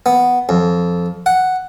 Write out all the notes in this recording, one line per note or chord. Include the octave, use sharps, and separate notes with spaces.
B3
F2
F#5